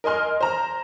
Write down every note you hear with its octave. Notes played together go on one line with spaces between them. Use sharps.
A#4 D#5 G#5 C6 F6
C5 A#5